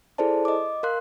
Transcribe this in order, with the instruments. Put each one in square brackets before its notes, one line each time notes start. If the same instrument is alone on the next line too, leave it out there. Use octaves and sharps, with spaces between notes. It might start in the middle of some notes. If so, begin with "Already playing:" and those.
[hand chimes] E4 G#4 A4 C5 D5 A5
D#5 D6
A#4 F5 C6 F#6